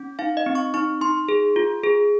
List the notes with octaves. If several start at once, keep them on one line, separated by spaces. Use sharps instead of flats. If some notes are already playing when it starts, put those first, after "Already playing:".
Already playing: C#4
D#4 F5
D#5
C4
C#6
D#4 C#6
D#4 C6
G#4
F4
G#4